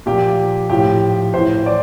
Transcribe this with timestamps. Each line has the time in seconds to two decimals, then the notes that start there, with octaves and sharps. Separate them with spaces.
0.06 A#2 F3 G4
0.70 A2 F3 G4
1.34 A2 E3 C5
1.66 D5